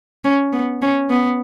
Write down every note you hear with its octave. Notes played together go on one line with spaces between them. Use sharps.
C#4
B3
C#4
B3